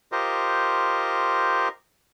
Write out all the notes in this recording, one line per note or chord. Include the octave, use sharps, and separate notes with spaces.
F4 G4 A#4 C5 D#5